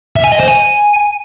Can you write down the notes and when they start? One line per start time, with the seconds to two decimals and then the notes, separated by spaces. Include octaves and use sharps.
0.16 E5
0.24 G#5
0.32 D#5
0.40 C5
0.48 G#5